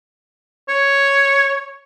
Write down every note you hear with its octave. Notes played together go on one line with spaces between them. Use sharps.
C#5